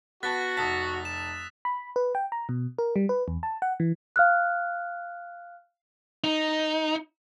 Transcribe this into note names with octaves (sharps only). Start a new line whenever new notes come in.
B3 F#4 A5 F#6 A6 B6
F1 A5 D#6 E6 B6
E7
B5
B4
G5
A#5
B2
A#4
G3
B4
E2
A5
F#5
E3
F5 F6 F#6
D#4